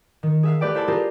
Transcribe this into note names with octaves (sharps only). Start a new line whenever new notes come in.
D#3
G#4 E5 F5
A3 G4 B4 D5 G5
E4 C5 E5 G#5 A5
D4 F4 G4 G#4 A#4